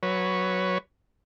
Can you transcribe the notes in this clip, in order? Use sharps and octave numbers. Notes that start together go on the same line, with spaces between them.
F#3 B4 C#5